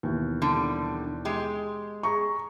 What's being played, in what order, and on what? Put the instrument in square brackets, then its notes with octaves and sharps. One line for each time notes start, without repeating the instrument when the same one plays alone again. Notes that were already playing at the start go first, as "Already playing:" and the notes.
[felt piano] D#2 B2 E3
[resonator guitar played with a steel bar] D3 G3
G#3 G4
[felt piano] G#4 A#5 C#6